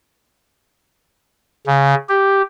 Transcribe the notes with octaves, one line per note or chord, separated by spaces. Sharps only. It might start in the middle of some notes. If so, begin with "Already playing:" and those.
C#3
G4